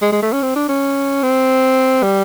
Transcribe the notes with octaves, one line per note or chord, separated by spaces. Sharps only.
G#3
G#3
A3
C#4
C4
D4
C#4
C4
G3